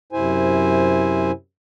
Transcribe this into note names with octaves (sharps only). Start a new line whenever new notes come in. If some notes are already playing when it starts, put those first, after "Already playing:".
F#2 C3 E4 C5 G#5